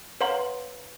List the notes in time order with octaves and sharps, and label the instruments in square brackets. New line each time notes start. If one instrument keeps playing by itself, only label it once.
[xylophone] B4 C#5 F5 F#5 A#5 C6